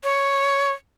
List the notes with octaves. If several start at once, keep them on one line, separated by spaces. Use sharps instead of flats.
C#5